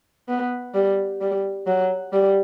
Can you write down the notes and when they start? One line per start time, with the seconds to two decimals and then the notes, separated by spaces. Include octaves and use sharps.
0.28 B3
0.75 G3
1.21 G3
1.67 F#3
2.13 G3